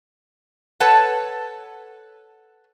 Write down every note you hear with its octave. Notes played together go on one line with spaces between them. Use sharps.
A4 B4 C#5 F#5 A5